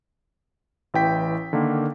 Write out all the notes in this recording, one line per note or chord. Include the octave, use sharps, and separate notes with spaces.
A1 E3 G5 B6
D3 D#3 A#3